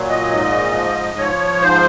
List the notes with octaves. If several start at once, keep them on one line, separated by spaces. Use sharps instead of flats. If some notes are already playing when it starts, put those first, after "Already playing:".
Already playing: A#2 F#3
D#5
G#2
F3
F3 C#5
G#2 C5